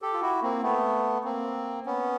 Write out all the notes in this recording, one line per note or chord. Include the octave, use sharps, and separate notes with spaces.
G4 A4
F4
E4 F#4
A#3 C4
A3 B3
A#3 C4
B3 C#4